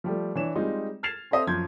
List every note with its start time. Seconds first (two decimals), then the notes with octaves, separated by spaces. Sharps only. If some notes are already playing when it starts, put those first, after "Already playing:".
0.04 F3 G3 A3
0.35 E3 D4 C#5 E7
0.55 G3 G#3 C4 D#4 F4
1.03 F6 G#6 A6 C7 E7 F7
1.31 C4 A4 C5 D#5 E5
1.47 F#2 F3 C6 G6 G#6